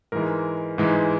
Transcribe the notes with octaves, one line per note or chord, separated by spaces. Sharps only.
G#2 E3 G#3 A#4
G#2 E3 G#3